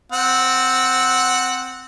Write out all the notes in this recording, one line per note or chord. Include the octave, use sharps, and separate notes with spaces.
C4 F#5